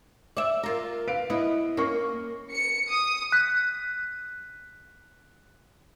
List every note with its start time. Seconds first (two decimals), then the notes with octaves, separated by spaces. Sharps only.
0.37 D5 E5
0.63 F4 A#4
1.07 B4 F5 D7
1.30 B3 E4 D#5
1.77 A#3 C#4 C#6
2.52 C#7
2.89 D#6
3.32 F#6 B6